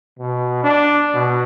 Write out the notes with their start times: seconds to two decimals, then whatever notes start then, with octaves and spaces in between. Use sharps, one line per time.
0.19 B2
0.64 D4
1.14 B2